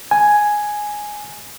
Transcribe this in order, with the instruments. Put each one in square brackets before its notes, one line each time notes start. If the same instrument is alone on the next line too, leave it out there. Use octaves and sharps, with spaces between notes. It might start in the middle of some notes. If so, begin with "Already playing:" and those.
[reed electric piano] G#5